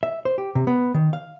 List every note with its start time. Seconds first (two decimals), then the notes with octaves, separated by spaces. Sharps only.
0.03 E5
0.25 C5
0.38 G4
0.55 C3
0.67 B3
0.94 D#3
1.13 F5